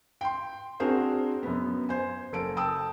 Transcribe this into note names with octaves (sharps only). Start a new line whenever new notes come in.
G5 C6
C4 D4 F#4 G#4 A#4 C5
F#2 B3
C5 G#5
F#1 A4 A#4 D7
G5 A5 D#6 E6